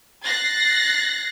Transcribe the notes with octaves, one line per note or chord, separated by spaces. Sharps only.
F#6 A6 A#6 C7